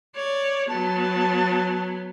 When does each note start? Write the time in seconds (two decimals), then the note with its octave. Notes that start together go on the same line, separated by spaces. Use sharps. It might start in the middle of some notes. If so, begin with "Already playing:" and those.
0.16 C#5 D5
0.69 F#3 B3 A5